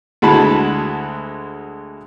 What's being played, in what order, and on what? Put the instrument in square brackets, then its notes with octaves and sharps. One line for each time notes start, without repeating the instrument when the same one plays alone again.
[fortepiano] D2 G#3 F#4 A5 B5